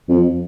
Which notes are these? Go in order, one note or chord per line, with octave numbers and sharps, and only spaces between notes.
F2